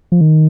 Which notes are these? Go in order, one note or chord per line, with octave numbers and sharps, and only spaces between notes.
F3
D#3